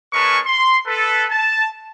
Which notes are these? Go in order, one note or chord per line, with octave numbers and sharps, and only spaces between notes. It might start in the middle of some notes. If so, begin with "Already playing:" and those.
G#3 C#4 A#4 B4 A5 C#6
C6
A4 B4
A5